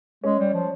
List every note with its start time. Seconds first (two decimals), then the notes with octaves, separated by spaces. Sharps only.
0.24 G#3 C#4
0.39 G3
0.54 F3